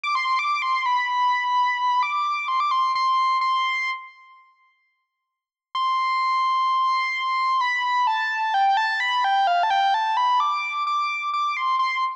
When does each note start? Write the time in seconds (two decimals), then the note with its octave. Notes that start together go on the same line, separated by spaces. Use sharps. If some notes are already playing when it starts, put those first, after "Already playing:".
0.04 D6
0.15 C6
0.39 D6
0.62 C6
0.86 B5
2.03 D6
2.48 C6
2.60 D6
2.71 C6
2.95 C6
3.41 C6
5.75 C6
7.61 B5
8.07 A5
8.54 G5
8.77 A5
9.00 B5
9.24 G5
9.47 F5
9.63 A5
9.70 G5
9.94 A5
10.17 B5
10.40 D6
10.87 D6
11.34 D6
11.57 C6
11.79 C6